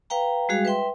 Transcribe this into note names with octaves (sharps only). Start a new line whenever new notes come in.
B4 F5 G5 A#5
G3 G#3 F#4 G#4 F5
B4 E5 G5 C6